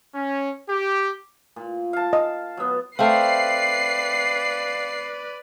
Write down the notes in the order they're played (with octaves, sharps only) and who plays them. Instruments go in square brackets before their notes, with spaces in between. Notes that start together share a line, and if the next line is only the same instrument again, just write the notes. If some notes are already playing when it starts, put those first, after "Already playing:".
[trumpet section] C#4
G4
[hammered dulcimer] A#2
F5 A5
[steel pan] D#5
[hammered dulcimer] F#3 B3
[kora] A3 C4 [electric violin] B4 D5 [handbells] F5 G5 F6 [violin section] C7